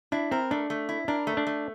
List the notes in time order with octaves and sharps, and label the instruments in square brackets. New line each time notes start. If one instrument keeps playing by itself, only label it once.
[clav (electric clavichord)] D4 [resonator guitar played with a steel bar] E4
[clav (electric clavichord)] C4 [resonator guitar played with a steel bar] A#4
[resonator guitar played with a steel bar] A3 [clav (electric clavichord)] D4
[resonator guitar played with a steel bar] A3
E4
[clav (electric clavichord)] D4 [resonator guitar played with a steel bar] A#4
[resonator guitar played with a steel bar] A3
[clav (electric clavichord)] D4
[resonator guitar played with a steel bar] A3